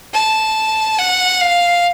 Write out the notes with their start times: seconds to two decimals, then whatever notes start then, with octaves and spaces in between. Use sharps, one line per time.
0.14 A5
0.99 F#5
1.41 F5